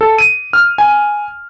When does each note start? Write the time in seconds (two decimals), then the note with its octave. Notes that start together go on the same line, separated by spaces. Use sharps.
0.01 A4
0.18 D#7
0.53 F6
0.78 G#5